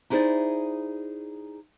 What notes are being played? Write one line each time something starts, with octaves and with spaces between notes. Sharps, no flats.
D#4 E4 G#4 B4 C5 D5